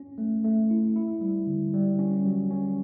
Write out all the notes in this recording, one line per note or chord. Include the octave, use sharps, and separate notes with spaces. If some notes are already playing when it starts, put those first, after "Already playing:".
Already playing: C#4
A3
A3
E4
E4
G3
D3
G3
C#4
F#3
C#4